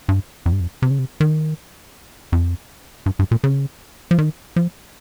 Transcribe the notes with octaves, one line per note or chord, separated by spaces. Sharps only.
G2
F2
G2
F2
C3
C#3
C3
D#3
F2
G2
G2
A#2
C#3
F3
D#3
F3